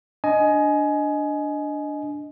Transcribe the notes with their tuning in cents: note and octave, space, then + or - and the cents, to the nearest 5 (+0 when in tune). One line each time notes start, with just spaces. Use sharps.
D4 +0 D#5 +0 G#5 +20